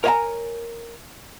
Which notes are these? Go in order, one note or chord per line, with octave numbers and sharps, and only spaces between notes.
A#4 C#5 D#5 F#5 G#5 A#5